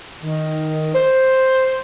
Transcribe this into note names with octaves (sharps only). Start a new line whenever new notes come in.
D#3
C5